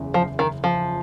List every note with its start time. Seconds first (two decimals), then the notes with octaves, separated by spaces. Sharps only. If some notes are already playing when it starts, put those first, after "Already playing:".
Already playing: F#1 E2 C#3
0.14 F3
0.39 D#3
0.64 F3